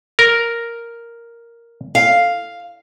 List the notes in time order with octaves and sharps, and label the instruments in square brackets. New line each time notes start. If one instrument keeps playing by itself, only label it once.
[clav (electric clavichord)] A#4
[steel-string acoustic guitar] F5